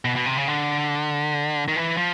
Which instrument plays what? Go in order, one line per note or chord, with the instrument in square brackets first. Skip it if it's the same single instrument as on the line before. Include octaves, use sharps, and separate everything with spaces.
[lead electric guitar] B2
B2
C3
C#3
D3
D#3
E3
F3